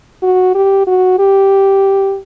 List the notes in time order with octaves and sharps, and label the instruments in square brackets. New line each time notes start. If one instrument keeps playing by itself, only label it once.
[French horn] F#4
G4
F#4
G4